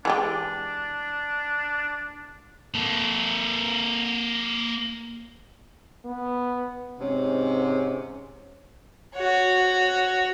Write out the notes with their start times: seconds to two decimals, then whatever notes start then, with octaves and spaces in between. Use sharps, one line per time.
0.05 E3 G#3 D4 G4
2.74 A#3 A4
6.05 B3
7.00 G#2 C3 C#4
9.16 F#4 C#5